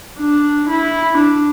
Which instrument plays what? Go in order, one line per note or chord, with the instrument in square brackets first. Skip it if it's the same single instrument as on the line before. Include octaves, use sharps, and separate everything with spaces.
[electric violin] D4
E4
D4